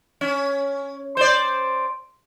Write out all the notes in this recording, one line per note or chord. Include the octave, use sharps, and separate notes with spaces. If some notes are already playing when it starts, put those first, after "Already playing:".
C#4
C5 D5